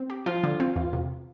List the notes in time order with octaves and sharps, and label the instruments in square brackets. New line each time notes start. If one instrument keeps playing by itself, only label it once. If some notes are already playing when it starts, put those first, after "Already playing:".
Already playing: [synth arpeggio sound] C4
G4
[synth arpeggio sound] F3 [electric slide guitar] F4
[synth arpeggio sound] D3
C4
E2
C3